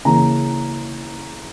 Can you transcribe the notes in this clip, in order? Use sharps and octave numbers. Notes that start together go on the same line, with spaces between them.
C#3 E3 A#3 C#4 A#5